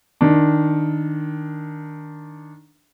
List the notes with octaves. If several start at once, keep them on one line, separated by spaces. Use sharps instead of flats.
D#3 D4